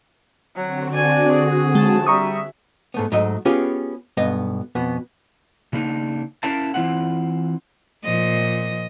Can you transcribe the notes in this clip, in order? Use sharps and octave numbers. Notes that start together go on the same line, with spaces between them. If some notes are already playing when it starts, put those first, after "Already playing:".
D3 F#3 C4 F#4
D4 D5 G#5
G#4
B1 F3 G#3 A5
G3 E5 A#5 C#6 D#6
G#2 A3 B3
G#2 F#3 A3 D#5
B3 C#4 F4 G4 G#4 B4
B1 G2 B3 D#5
F2 B2 B3
C#3 A#3 D4 D#4
C#4 E4 A#4 E5 F5 A5
E3 C4 E4 F4 F#5
A#2 F3 D#5